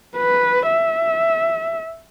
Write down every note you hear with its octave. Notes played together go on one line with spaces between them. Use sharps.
B4
E5